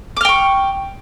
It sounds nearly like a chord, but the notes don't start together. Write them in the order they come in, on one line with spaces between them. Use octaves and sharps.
D6 F6 G5 C#6